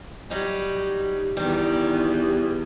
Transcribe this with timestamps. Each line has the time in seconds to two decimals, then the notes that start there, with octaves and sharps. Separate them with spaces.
0.30 F#3 G3 D#4
1.37 E2 D#3 G3